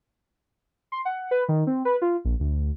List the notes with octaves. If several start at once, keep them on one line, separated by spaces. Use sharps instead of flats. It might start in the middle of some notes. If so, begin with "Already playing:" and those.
C6
F#5
B4
D#3
C4
B4
F4
A#1
D2